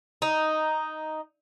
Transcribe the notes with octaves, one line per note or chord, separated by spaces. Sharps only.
D#4